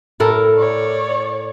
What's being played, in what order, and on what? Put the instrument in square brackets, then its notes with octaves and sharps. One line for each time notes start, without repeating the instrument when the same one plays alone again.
[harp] A2 [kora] E4 A4 A#4
[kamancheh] C#5 D5